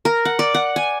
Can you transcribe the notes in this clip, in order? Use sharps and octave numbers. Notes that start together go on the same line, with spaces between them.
A#4
F#5
D5
F#5
G#5